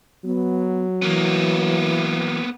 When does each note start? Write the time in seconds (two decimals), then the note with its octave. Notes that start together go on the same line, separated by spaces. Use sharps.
0.24 F#3 B3
1.02 E3 A#3 B3